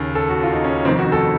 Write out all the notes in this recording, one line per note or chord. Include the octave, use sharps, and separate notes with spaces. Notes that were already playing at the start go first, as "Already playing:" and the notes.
Already playing: D#2 C#3
A4
F#4
F4
D#4
C#4
F1 F2 D#3 C4
F#4
A4